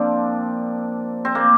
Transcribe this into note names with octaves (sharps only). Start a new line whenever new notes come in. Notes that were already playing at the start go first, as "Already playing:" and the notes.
Already playing: F3 A#3 C4 D4
C4
A#3